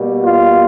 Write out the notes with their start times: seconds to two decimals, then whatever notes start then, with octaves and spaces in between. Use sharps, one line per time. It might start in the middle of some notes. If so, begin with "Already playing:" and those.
Already playing: B2 G3 A#3
0.23 F4